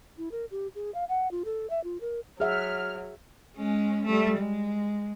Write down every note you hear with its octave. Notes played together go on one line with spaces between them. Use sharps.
E4
A#4
G4
G#4
F5
F#5
F4
A4
E5
F4
A#4
F#3 G#4 E5 F#5 F6
G#3 C#4
G3 A3
G#3